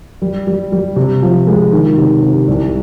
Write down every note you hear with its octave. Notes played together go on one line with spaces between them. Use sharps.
G3
G3
G3
C3
F3
G#3
D#3
C3
C3
C2